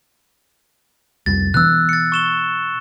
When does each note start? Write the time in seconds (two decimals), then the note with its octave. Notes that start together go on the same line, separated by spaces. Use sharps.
1.26 C2 F2 G3 A6
1.54 B2 E3 B3 E6 F#6
1.89 A6 C#7
2.12 C#6 E7 G7